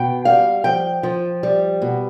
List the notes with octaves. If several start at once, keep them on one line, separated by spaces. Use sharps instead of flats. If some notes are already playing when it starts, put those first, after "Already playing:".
Already playing: B2 G5
G3 F5
F3 G5
F3
G3
B2